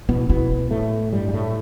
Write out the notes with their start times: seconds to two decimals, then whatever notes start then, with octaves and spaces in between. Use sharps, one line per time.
0.09 B2 B3 E4
0.29 B2 B3 E4
0.71 A2 A3
1.13 G2 G3
1.29 G3
1.34 A2 A3